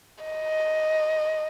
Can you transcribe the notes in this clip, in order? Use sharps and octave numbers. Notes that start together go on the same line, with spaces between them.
D#5